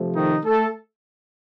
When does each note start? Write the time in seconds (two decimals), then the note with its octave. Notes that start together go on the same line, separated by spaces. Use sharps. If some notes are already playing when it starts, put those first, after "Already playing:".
Already playing: C3 F3 A3
0.13 D#3 D#4
0.45 A3 A4